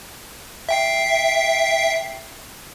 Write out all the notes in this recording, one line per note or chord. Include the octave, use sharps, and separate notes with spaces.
E5 G5 C7